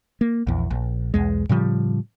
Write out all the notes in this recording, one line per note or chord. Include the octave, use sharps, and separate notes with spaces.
A#3
A#1 E2
A#1
B1 E2 G#3
A2 C#3 F3 G3